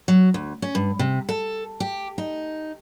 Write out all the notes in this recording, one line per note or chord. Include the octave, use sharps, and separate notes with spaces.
F#3
D2
C#4
G2
C3
A4
G4
D#4